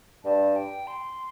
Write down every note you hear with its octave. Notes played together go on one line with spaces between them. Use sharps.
G2 A5
G5
C6